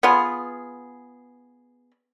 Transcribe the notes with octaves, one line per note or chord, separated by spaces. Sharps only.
B3 F4 G#4